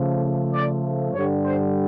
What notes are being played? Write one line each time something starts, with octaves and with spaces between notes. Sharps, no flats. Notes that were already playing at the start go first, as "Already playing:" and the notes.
Already playing: C#3 F3 A3
D5
G2 D3 G3 C#5
C5